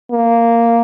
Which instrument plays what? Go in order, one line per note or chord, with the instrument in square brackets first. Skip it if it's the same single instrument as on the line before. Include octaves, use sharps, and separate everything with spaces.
[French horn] A#3